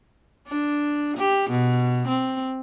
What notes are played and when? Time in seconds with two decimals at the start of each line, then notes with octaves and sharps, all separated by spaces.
0.48 D4
1.17 G4
1.50 B2
2.08 C4